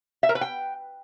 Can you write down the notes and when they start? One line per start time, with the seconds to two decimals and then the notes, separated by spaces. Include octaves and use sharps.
0.23 E5
0.29 A#4
0.35 B4
0.41 G5